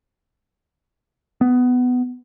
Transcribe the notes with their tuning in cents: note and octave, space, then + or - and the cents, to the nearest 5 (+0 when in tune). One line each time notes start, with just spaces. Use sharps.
B3 +15